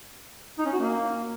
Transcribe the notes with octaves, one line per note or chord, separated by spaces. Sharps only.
D#4
C#4
F#4
A#3